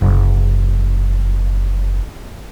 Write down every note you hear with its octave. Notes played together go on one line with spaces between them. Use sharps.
F#1 C3